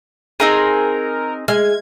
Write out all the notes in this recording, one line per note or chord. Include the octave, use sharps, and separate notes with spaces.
C4 D#4 G#4 A#4
G#3 F6 G#6